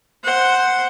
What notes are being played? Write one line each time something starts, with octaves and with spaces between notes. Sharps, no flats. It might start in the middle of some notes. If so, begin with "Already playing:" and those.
C5 F#5